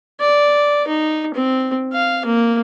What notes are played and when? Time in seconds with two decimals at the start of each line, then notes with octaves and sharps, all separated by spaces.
0.20 D5
0.88 D#4
1.34 C4
1.93 F5
2.25 A#3